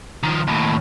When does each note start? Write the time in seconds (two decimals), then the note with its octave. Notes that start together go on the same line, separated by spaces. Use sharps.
0.23 D#3 F3
0.48 D#2 A2